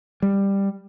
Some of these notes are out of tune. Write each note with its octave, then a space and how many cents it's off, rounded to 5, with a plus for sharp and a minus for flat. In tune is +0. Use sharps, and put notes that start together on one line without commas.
G3 +10